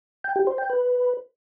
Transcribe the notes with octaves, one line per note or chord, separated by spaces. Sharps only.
G5
G4
C5
G5
B4